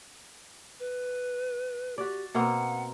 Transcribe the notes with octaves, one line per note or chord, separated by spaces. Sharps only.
B4
F#4 G4 D5
B2 A#3 C4 F#5